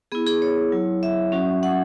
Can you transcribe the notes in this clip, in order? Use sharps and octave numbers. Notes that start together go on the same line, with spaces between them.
B3 E4 G#4
G#4
C#5
F#3 E4
E5
F#3 C#4 F#4
F#5